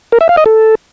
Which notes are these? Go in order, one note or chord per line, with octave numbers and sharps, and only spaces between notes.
A#4
E5
F5
D#5
A4